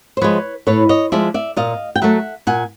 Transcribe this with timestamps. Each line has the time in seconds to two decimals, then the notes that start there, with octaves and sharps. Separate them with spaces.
0.17 C5
0.21 F3 G#3 B4 C#5
0.67 A2 B4 C#5
0.89 C#5 D#5
1.12 F3 G#3 D5 E5
1.34 D5 E5
1.56 A#2 D#5 F5
1.96 G5
2.02 F#3 A3 E5 F#5
2.47 A#2 F#5 G#5